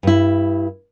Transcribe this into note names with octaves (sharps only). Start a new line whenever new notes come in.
G2 E4